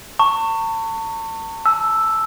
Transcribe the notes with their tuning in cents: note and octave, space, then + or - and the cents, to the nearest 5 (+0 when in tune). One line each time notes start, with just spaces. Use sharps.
A5 +40 C#6 +0
A5 -30 E6 +0